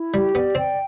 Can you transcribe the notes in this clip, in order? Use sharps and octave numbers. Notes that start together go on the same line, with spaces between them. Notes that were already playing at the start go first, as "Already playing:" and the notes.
Already playing: E4
G3 G4
B3 D5
C4 G5